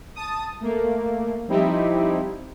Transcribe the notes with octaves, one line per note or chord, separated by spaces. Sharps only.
A5 D#6
A3 A#3
F3 G3 C4 D#4 E4 G4